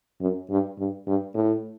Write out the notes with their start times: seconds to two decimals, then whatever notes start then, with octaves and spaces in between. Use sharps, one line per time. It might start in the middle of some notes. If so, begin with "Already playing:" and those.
0.20 F#2
0.50 G2
0.78 G2
1.07 G2
1.34 A2